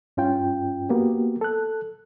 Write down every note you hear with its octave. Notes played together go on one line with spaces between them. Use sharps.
G2 C#4 F4 G5
A#3 B3 F#4 G4
A4 F#6